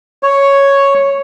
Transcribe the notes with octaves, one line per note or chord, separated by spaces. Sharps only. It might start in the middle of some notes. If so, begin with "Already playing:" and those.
C#5